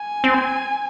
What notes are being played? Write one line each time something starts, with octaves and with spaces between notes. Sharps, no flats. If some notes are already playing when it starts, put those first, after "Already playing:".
Already playing: G#5
C4